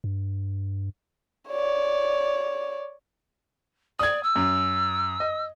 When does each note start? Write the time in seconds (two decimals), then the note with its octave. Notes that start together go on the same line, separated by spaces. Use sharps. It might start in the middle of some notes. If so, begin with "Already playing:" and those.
0.04 G2
1.49 C#5 D5
3.99 D5 D#6 G#6
4.23 E6
4.36 F#2
5.20 D#5